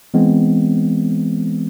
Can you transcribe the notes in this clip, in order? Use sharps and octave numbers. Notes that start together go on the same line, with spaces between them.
E3 G#3 B3 C4